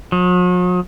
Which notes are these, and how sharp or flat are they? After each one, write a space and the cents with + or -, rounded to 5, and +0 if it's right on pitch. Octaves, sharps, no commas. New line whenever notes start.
F#3 -45